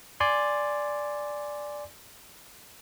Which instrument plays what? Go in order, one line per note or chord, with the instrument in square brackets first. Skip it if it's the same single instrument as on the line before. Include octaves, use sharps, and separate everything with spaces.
[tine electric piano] D5 G#5 C6